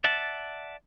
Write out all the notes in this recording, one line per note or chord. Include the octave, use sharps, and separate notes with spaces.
D5 E5 F#5 A5